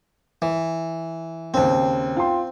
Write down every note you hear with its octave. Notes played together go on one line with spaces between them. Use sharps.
E3
D#2 C#3 C4
F4 G5 C6